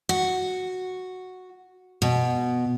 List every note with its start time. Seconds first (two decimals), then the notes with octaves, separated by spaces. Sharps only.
0.09 F#4
2.02 B2